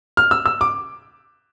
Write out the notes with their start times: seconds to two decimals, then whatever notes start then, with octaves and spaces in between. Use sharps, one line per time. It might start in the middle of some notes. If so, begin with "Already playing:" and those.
0.17 F6
0.31 E6
0.46 E6
0.61 D6